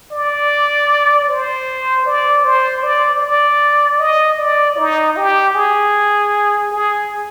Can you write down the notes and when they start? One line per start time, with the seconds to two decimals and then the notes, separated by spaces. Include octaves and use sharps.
0.12 D5
1.28 C5
2.06 D5
2.44 C5
2.83 D5
3.22 D5
3.99 D#5
4.38 D5
4.78 D#4
5.16 G4
5.55 G#4
6.72 G#4